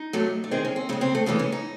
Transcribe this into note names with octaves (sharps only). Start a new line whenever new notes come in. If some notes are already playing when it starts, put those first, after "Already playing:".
Already playing: D#4
C3 F#3 A3
A3
D#3 G#3 C4
C#4
C4
C#3 G#3 A3
C4
A3
C#3 E3 G#3 A3
C#4
D#4